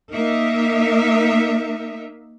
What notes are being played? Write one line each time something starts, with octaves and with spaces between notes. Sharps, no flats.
A#3 D#4 A#4 E5